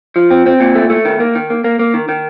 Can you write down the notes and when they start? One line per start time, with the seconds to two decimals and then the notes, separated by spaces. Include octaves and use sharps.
0.16 F3
0.31 C4
0.46 C4
0.60 A#2
0.75 A3
0.90 A3
1.05 D#3
1.20 A#3
1.35 D#3
1.50 A#3
1.64 A#3
1.79 A#3
1.94 D#3
2.09 D#3